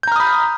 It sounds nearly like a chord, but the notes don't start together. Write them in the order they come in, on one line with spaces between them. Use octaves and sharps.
G6 A#5 F6 D#6 B5